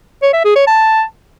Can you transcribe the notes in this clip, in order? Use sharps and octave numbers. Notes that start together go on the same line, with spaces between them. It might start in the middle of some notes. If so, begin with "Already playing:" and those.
C#5
E5
G#4
C#5
A5